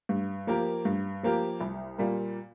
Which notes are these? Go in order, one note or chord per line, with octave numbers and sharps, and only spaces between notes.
G2
F3 A#3 G4 A#4
G2
F3 A#3 G4 A#4
C2
A#2 G3 A#3